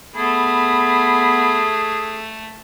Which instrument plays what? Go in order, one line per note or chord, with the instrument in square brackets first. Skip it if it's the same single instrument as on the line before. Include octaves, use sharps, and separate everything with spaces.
[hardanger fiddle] A3 [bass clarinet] B3 [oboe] G#4 [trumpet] B5